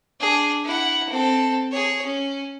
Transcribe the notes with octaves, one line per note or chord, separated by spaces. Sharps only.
D4 G#4
E4 F#5
C4 A4
G#4 C#5
C#4